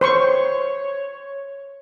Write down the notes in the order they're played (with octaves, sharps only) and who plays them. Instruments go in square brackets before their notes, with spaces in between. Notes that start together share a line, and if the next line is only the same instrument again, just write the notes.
[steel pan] C5 C6 C#6 [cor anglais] C#5